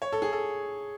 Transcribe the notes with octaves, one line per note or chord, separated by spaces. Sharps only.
C#5
A4
G#4
A4